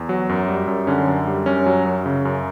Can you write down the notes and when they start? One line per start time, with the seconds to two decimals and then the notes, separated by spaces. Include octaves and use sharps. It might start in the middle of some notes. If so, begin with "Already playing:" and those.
Already playing: E2
0.09 F#3
0.29 F#2
0.48 G3
0.68 F#2
0.87 D3 C#4
1.08 F#2
1.27 G3
1.46 F#2 C#4
1.66 F#3
1.85 F#2
2.06 C#3
2.25 F#2